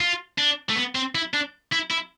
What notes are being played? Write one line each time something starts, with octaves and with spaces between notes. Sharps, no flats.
F4
D4
A3
B3
C4
E4
D4
E4
E4